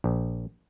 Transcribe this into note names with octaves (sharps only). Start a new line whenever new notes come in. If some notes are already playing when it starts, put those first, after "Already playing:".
A#1